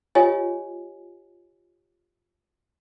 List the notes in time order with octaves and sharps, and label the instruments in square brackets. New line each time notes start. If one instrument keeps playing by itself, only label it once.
[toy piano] F4 G4 C#5 D#5 G#5